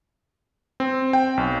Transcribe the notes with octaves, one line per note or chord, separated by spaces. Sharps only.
C4
G5
B1